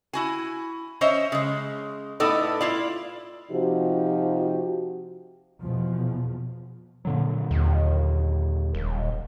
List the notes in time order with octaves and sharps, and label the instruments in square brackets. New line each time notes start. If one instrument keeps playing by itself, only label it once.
[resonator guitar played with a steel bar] E4 F#4 G#5
C#4 C5 C#5 D#5 E5
C#3 G#3
A2 B3 D#4 A4 D5
E4 F4 D5
[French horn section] C3 F3 D#4 F#4 G4
[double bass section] E2 B2 F3
[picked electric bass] A#2 D3 F#3
[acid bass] D#2
D#1